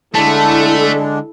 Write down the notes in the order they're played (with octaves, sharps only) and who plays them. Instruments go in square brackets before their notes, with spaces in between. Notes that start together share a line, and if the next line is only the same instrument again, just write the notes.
[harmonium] D3 G#3 D4 [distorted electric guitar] A3 [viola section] E4 A4 [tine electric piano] A5